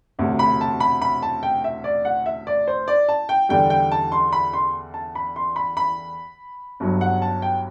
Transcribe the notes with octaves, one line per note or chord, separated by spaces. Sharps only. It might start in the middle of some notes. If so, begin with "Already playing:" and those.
E1 D2 C3
B5
A5
B5
B5
A5
G5
E5
D5
F#5
E5
D5
C5
D5
A5
G5
E2 D3 G3 G5
G5
A5
C6
B5
C6
A5
B5
C6
B5
B5
G1 G2 F#3
F#5
A5
G5